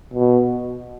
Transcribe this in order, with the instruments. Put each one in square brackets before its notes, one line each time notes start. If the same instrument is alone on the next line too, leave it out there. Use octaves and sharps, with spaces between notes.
[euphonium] B2